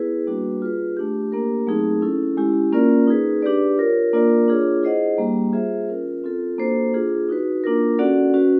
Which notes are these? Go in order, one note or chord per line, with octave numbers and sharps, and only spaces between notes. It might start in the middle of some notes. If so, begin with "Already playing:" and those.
Already playing: B3 E4 G#4 B4
G3 A#3 D4 F#4 B4
F4 G#4 B4
A3 D4 G4
A#3 D4 G4 A#4
F#3 A3 C4 D#4 G#4
C#4 E4 A4
G#3 C#4 E4 G4
A#3 C#4 F4 A#4 D5
D#4 G#4 B4
D4 G4 B4 D5
F4 A#4 C#5
A#3 D4 F4 A#4 D5
D4 F4 G#4 C#5
E4 G#4 C5 D#5 F#5
G3 A#3 D4 G4
F4 G#4 C5 E5
C#4 F4 A#4
C4 F4 A4
A#3 D4 F#4 A4 C5
D4 F4 G#4
D#4 F#4 B4
A#3 D4 F4 A#4
C#4 F#4 A4 D5 F#5
C#4 F#4 B4